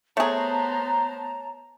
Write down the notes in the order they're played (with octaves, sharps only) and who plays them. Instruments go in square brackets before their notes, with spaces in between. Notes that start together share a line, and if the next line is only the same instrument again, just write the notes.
[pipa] A3 G#4 [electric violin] B3 C5 [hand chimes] C#5 [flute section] A5 A#5